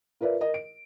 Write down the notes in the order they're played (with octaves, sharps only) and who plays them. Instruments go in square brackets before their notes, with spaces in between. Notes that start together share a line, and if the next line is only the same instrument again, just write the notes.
[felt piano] F4 A#4 B4 D5 E5
A#4 D#5
D7